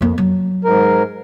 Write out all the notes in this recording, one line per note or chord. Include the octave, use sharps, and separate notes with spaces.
F2 A#3
F#3
G#2 A#4